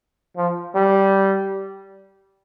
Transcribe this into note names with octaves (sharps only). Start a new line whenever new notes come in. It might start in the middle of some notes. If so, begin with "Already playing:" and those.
F3
G3